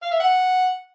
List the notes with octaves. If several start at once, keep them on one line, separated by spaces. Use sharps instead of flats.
F5
E5
F#5